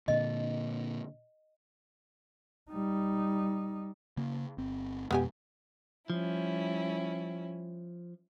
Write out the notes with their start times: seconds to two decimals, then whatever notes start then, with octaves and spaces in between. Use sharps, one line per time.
0.08 A#2 D3 D#5
2.71 G3 D#4
4.17 C#3 A#3
4.58 G1 C4
5.11 F2 B2 G#3 B3 G4 G#5
6.10 F3 G3 C#4 E4